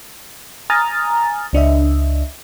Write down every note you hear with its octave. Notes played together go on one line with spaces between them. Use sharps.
G#5 A#5 D#6 F6 A6
C#2 D4 D#5 E5